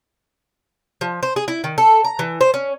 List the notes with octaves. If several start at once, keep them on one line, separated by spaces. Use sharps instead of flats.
F3
C5
G#4
E4
D#3
A4
A#5
E3
C5
C#4